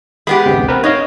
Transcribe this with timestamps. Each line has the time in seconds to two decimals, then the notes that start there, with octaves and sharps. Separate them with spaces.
0.27 G#3 B3 G4 B5
0.46 A1 D2 C3
0.68 C4 A#4 B4
0.84 D#4 C#5 D#5 F5